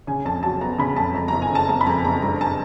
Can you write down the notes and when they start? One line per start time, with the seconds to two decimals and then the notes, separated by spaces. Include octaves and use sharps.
0.07 C#3 G#5
0.25 F2 A5
0.43 F#3 A5
0.61 B3 A#5
0.78 C#3 B5
0.96 F2 A5
1.14 F2 A#5
1.28 F#1 A#5
1.42 G#5
1.51 C#3 A5
1.69 F#1 A5
1.81 B5
1.87 F2 A#5
2.05 F#1 A#5
2.22 G2 A#5
2.41 A5